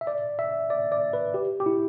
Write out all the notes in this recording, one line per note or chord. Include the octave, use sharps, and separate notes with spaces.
E5
D5
E5
D5
D5
B4
G4
G4
E4